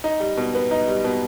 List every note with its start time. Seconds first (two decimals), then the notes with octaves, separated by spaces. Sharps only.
0.04 D#4
0.20 G3
0.37 B2
0.55 B3
0.71 D#4
0.88 G3
1.04 B2